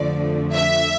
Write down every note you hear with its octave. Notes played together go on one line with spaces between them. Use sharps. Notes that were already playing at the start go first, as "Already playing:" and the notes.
Already playing: F2 D3 F3 A3 D5
E5